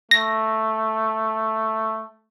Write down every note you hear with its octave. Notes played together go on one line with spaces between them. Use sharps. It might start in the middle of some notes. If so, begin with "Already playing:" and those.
A3 A#6